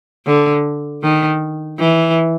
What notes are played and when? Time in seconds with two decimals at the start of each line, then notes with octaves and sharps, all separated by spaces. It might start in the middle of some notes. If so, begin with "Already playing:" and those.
0.27 D3
1.03 D#3
1.79 E3